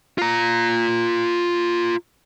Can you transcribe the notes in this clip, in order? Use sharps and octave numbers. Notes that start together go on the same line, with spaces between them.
F4 A#5